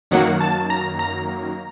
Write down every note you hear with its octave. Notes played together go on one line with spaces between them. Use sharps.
F#2 D#3 F#3 A#3 F#5
A5
A#5
A#5